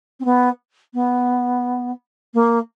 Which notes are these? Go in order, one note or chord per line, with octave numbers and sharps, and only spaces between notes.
C4
B3
B3
A#3